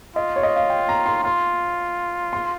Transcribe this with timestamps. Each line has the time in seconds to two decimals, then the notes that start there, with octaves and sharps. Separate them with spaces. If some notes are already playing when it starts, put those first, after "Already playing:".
0.16 F4 D#5
0.36 C#5
0.43 D#5
0.56 F5
0.70 G5
0.89 A#5
1.06 C6
1.24 F4 C6
2.33 C6